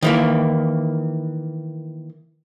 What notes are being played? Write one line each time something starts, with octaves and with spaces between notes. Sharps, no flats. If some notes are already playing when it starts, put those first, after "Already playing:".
D#3 E3 A#3